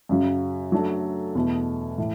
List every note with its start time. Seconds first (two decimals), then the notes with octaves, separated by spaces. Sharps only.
0.09 F#2 C#3 F#3
0.72 F#3 A3 D4 A4
1.35 E2 B2 A3
1.98 A2 E3